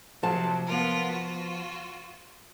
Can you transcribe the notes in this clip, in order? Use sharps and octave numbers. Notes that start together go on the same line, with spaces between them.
C3 F3 F#3 A5
B3 F4 A#4
F4 F#4